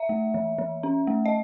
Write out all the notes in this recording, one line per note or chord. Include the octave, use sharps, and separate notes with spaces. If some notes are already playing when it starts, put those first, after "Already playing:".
Already playing: E5
A3
E3
E3
C#4
A3
D#5